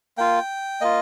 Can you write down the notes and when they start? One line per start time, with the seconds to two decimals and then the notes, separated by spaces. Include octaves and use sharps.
0.18 A#3 F4 G5
0.81 A#3 F4 D#5